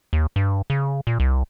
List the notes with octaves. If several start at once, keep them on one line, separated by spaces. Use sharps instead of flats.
D#2
G2
C#3
A#2
C2